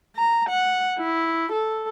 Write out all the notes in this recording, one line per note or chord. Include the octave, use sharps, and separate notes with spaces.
A#5
F#5
E4
A4